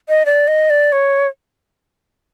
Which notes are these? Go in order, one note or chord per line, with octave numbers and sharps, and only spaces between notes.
D#5
D5
D#5
D5
C#5